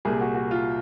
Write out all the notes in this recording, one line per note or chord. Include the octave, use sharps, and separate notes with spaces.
C2 A#2 G3 G#4
F#4
F#4
F4